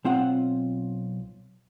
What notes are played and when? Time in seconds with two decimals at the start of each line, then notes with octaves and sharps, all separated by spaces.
0.05 B1 C4 F4 F#5